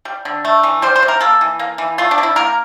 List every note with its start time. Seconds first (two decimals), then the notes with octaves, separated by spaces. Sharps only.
0.05 G3
0.25 D3
0.45 A3
0.63 E3
0.82 G3 C5
0.96 C5
1.03 C3
1.08 A#4
1.21 A#3 A4
1.41 E3
1.59 A#3
1.78 E3
1.98 A3 F4
2.11 D4
2.18 D3
2.23 E4
2.36 A#3 A#4